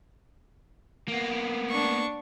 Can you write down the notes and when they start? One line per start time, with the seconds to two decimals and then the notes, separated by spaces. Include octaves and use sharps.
1.08 A#3 B3
1.70 D4 C#6